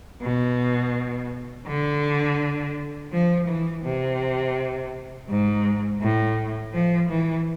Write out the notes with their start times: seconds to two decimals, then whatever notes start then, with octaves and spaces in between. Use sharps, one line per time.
0.22 B2
1.67 D3
3.12 F3
3.48 E3
3.83 C3
5.28 G#2
6.01 A2
6.73 F3
7.09 E3